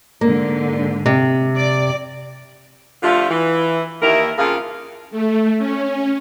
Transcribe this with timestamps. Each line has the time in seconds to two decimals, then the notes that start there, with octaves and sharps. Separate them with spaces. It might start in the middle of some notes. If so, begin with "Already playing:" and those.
0.21 G#2 D3 A#3
1.06 C3
1.56 D5
3.03 D3 F3 G3 A3 F4
3.30 E3
4.02 D#2 E4 A#4
4.38 F2 C#3 A#3 F4 G#4 F5
5.11 A3
5.58 C#4